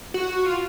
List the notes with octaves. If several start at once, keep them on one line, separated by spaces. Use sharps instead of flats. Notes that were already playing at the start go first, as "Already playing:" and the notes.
F#4
F4